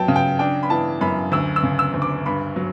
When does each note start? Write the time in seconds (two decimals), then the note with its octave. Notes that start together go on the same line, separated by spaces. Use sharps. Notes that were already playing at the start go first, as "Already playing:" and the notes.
Already playing: F#3 G5 A5
0.08 C#3
0.16 G5
0.39 D4 G5
0.63 B5
0.70 E3 A5
1.01 F#2 B5
1.32 D2 E6
1.56 E6
1.63 C#3
1.79 E6
1.94 D2
2.02 D6
2.26 G2 B5
2.56 F#3